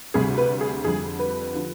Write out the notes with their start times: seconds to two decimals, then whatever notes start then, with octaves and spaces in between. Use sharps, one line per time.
0.14 D2 C3 G3 G#4
0.38 B4
0.61 G#4
0.84 F2 D3 G3 G#4
1.19 B4
1.54 D3 F3